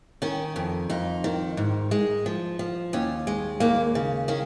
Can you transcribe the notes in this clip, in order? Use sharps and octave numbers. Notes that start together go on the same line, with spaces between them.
D#3 C#4
F2
F2 D#4
D#3
G#2
G#3
F3
F3
D#2 C#4
G#3
D#2 A#3
C#3
D#3 C#4